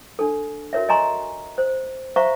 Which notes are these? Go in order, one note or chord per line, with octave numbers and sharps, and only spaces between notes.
D4 A4
F#4 A#4 C#5 E5
D#5 G#5 A#5 C6 C#6
C5
C5 E5 F5 A#5 C#6